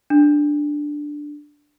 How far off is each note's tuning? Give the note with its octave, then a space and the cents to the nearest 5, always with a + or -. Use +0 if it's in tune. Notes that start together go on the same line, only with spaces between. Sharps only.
D4 +5